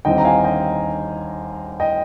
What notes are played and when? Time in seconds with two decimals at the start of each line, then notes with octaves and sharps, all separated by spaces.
0.05 D#2 D3 G3 C4 D#4 D#5 G5
0.18 A#5
0.25 F5 G#5
0.44 D#5 G5
1.80 D#5 G5